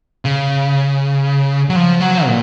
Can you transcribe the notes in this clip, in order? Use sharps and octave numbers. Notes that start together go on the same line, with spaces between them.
C#3
F#3
F3
F#3
A#2